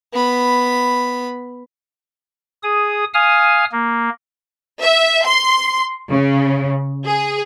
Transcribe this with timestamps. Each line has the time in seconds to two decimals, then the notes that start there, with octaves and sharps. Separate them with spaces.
0.13 B3 B5
2.63 G#4 D#6
3.14 F5 G#5 D#6 F6
3.72 A#3
4.83 E5
5.26 C6
6.10 C#3
7.04 G#4